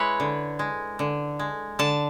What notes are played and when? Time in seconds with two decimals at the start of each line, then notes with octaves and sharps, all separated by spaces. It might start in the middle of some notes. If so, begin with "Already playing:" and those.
Already playing: G#3 E4 B4 C#5
0.20 D3
0.59 G#3
0.99 D3
1.39 G#3
1.79 D3 A5